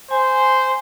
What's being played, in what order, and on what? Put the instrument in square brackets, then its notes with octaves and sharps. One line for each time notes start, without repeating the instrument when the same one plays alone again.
[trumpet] C5 [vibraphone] G#5